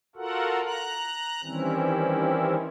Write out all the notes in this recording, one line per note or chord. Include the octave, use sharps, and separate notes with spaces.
F4 F#4 A4 A#4 F#5
A#5 F#6
D#3 E3 G3 C4 C#4 E4